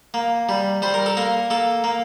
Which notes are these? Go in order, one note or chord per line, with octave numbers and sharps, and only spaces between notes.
A#3
G3
G3 C5
A#4
A4
A#3 A#4
A#3 A4
A#3